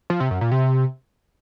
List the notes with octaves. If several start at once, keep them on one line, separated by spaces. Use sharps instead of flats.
F3
C3
F#2
A#2
C3